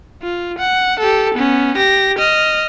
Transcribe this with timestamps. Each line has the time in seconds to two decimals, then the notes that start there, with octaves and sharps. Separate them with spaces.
0.22 F4
0.58 F#5
0.99 G4 A4
1.34 B3 C#4
1.77 G4 A#6
2.18 D#5 F6